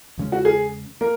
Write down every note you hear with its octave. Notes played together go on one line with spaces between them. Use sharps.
E2 C#3 G#3 C#4
F#4
G#4
A#3 A#4